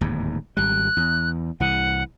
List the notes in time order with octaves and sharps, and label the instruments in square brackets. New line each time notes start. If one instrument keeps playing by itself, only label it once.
[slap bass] D1 D#2 G#2
[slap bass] G#1 G3 [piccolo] F#6
[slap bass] E2
[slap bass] C2 E3 [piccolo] F#5